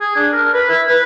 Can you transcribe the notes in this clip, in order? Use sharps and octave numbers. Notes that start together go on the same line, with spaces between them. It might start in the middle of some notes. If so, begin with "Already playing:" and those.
G#4
D4
A#4
B4
E4
B4